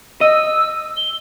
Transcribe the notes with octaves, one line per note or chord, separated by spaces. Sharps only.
D#5 E6
G7